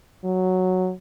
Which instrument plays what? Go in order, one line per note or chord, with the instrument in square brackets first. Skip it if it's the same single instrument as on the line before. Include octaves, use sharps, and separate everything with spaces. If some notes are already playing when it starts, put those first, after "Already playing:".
[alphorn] F#3